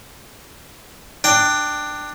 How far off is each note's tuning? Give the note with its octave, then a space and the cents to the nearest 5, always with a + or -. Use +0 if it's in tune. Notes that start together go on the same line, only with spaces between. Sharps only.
D4 +15 G5 +0